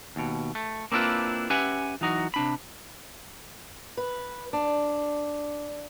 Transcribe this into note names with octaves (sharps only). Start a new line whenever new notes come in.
D#2 B2
A3
A#3 C4 D4 E4 F4 B4
C#4 G4 B4 E5 F#5 G#5
E3 F#3 D#4 F#4
C3 D4 B5
B4
D4